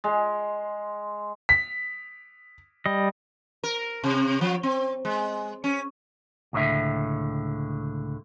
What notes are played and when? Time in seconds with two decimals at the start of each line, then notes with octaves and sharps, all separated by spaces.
0.04 G#3
1.49 B6
2.86 G3 D#5
3.64 A#4
4.04 C3
4.41 F3
4.63 C4
5.05 G#3
5.64 C#4
6.53 C#2 A2 D3 E5